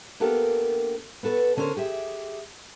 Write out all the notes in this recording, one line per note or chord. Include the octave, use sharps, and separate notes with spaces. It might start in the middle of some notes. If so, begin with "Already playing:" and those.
A#3 B3 D4 G4 A4 A#4
B3 F#4 A4 B4
D3 C#4 D4 A#4 C5
G4 G#4 E5